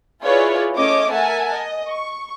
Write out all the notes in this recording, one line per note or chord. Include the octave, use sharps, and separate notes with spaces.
E4 F4 G#4 B4 C#5 D5
A3 C#4 C#5 D#5 D6
A#4 E5 F#5 G#5 A5
D#5
C#6